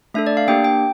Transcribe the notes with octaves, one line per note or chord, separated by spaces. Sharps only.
A3 D4 A4 E5
D5
F5
A#3 D4 G4 G5
G5